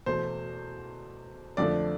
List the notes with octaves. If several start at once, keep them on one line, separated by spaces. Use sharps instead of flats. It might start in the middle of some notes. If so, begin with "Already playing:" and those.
E2 B2 A3 C5
F2 D3 F3 A3 D5